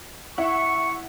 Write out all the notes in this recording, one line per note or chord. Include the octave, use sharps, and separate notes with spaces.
E4 E5 F#5 C#6